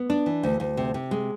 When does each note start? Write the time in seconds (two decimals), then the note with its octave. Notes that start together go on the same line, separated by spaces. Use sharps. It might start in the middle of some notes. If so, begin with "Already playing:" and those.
Already playing: B3
0.10 D4
0.26 E3
0.43 D2
0.60 D2
0.77 C3
0.94 C3
1.11 G#3